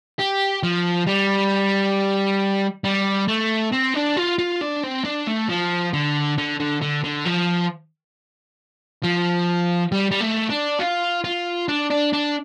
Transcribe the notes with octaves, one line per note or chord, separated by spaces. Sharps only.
G4
F3
G3
G3
A3
C4
D4
F4
F4
D4
C4
D4
A3
F3
D3
D3
D3
D3
D3
F3
F3
G3
G3
A3
D4
F4
F4
D4
D4
D4